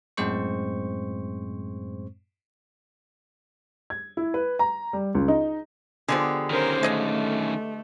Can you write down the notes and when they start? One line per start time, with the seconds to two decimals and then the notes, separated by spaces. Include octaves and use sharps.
0.17 F#2 A2 G#3 C4 C5 C#6
3.90 G#6
4.17 E4
4.34 B4
4.59 A#5
4.93 G3
5.15 C#2
5.28 D#4
6.08 D3 F3 G#3 B3 G4 G#4
6.50 D#3 C#4 A#4 C5
6.83 G#3 A3 D#5 F5